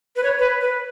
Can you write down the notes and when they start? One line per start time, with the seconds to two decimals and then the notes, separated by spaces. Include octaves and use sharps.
0.16 B4
0.23 C#5
0.39 B4
0.61 B4